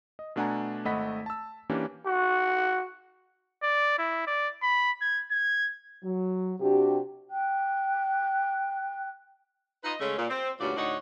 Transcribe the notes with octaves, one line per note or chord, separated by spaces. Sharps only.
D#5
B2 A3 D4 F#5 G#5 A#5
G#1 A3 D#5 F#5 B5 B6
A5 E6
E3 A#3 C#4 D4 G4
F#4
D5
E4
D5
B5
G#6
G#6
F#3
C3 D4 F#4 G4
G5 F#6
D#4 F4 B4 D#5
C#3 G#3 A3 C#4
A#2
C4
D2 G2 A#2 C#4 F#4 D5
D2 A2 D4 D#4 C#5 F#5